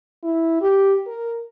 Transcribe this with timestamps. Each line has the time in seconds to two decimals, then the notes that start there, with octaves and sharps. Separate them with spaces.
0.23 E4
0.62 G4
1.07 A#4